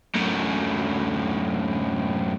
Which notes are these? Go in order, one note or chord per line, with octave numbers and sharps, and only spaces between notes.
F#2 A2